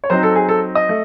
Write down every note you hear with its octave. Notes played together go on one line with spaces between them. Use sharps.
C#5
F#3 C4 D#4 C5
A4
G#4
A4
D#5
A3